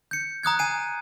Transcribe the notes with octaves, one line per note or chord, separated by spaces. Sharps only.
G6 C#7
A#5 D#6 F#6 G#6
G#5 C7 D#7